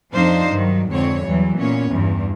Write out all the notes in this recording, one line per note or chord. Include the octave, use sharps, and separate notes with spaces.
F2 F3 D4 D#4 C5 F5
G2 D#3 F#3
F2 G#2 D3 C4 C#5
E2 E3 F#3 G3
A#2 B3 C#4 C#5
E2 G2